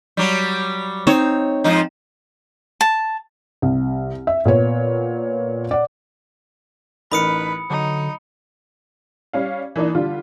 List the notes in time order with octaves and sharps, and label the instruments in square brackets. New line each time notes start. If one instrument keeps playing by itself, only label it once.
[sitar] F#3 G3
[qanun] C4 D#4 C5 [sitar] C#5
[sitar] G#2 F3 D#4
[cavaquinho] A5
[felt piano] C2
E5
A#2 B3 C#5
D5 F#5
[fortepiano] A1 D#4 A#4 [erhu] B4 [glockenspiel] B5 D#6 C#7
[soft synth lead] D3 [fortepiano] F#3 [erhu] D#4
[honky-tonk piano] G3 C#4 F5
E3 A#3 D4 D#4
D3 G3 F4